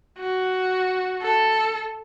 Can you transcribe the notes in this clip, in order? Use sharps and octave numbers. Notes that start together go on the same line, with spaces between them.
F#4
A4